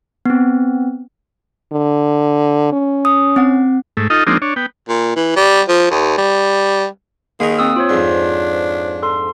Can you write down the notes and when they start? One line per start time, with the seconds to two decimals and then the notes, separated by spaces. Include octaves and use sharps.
0.25 B3 C4
1.73 D3
2.73 C#4
3.05 D#6
3.36 C4 F#5
3.97 G#2 A3
4.10 D#4 F4 A4 D#5
4.27 F3 G#3 A#3 C4 D4 D#4
4.42 D4 C#5
4.56 B3 G5
4.89 A#2
5.16 E3
5.36 G3
5.69 F3
5.91 D#2
6.18 G3
7.40 D#3 A#3 G#4 A#4
7.58 C4 D#6 E6
7.76 F4 C5 C#5
7.90 F2 G#2 D4
9.03 A4 C6